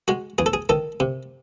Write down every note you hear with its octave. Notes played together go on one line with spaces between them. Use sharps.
G#3 F#4
E2 G#4
A4
G#4
D#3 A4
C3